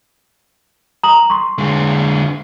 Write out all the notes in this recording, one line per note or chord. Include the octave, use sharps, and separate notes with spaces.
A#5 D#6 F#7
C6 C#6
D3 G#3